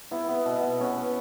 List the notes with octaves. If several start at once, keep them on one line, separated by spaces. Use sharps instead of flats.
B3 E4
B3
B2
B2
B3 C#4
B3